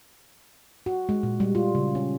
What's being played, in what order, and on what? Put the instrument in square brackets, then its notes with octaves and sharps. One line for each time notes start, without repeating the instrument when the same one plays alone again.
[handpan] F#4
G#3
A#2
G3
F4
C#3
C#4